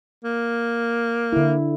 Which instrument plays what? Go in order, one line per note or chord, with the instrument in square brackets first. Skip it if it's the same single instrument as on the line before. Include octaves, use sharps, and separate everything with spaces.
[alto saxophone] A#3
[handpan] D3 E4